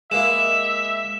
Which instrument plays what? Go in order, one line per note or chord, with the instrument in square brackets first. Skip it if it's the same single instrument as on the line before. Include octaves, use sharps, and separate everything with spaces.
[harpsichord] G#3 A#3 E4 [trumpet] E5 [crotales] E7